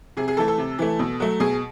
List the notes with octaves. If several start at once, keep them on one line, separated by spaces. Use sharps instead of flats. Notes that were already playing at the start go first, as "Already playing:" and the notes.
C3 G#4
G#4
E3 A3 A4
A4
C3
E3 A3
B2
F#3 A3
B2 G#4